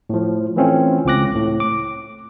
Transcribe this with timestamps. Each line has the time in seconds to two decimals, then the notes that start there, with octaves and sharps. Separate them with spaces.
0.10 A2 F3
0.56 E3 A3 C4 C#4 F4
1.05 C#2 C4 F4 D6 F#6 A#6
1.35 A2
1.60 D6